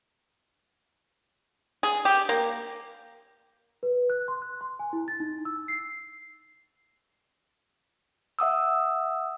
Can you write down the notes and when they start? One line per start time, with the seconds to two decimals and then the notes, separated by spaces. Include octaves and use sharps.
1.83 G#4
2.05 G4
2.29 A#3
3.83 B4
4.10 F#6
4.28 C6
4.42 F#6
4.61 C6
4.79 G#5
4.93 E4
5.08 A6
5.20 D#4
5.45 E6
5.68 C7
8.39 E5 F#5 D#6 E6